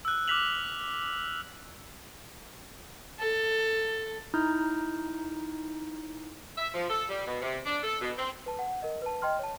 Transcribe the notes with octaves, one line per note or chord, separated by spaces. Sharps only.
E6 F#6
D6 F6 F#6 B6 F7 F#7
A4
D#4 E4 A#5 D#6 F6 G6
E5
F3
A4
G3
B2
C3
D4
A4
B2
C4
B4 A5
F#5
A#4 D#5
B4 A5
D#5 G5 C6 F6
C#5 A5